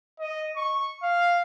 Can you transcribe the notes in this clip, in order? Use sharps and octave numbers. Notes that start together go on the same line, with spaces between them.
D#5
C#6
F5